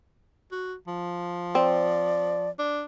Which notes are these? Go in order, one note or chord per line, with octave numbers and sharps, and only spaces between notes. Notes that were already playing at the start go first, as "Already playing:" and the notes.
F#4
F3
C4 D5
D4